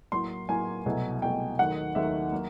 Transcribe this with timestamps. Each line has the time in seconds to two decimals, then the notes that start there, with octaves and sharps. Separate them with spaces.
0.12 A2 F#3 A#3 C6
0.48 A2 F#3 A#3 G#5
0.86 C2 B2 F#3 A3
1.22 C2 B2 F#3 A3 G5
1.59 D#2 D#3 F#3 A3 F#5
1.95 D#2 D#3 F#3 A3 E5
2.32 F#3 A#3